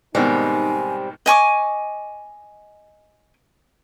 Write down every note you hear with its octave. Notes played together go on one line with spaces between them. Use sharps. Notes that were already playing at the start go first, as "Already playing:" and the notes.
G#2 B2 D#3 G3 C4 D#4 G#5
D#5 G#5 C#6 D6